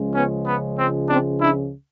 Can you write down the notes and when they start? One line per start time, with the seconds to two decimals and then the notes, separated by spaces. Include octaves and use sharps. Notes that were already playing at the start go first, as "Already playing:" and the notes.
Already playing: C#2 C#3 F3 G#3
0.13 B3 C#4
0.45 B3
0.77 C4
1.07 C4 D4
1.39 D4 E4